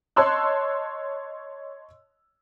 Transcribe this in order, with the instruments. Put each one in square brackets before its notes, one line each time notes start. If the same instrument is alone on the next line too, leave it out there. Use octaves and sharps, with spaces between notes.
[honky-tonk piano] C#5 D#5 A5 C6 E6 F#6